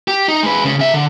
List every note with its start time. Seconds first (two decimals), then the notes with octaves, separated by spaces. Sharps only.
0.08 G4
0.28 D#4
0.43 G#3 B4
0.64 D2 C#3
0.79 C#3 E5
0.94 D3